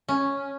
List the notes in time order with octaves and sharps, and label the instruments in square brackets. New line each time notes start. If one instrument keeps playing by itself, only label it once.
[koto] C#4